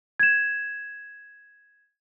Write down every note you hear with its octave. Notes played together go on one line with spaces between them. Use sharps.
G#6 E7